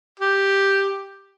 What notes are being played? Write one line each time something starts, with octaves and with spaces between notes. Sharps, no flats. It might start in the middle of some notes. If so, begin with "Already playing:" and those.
G4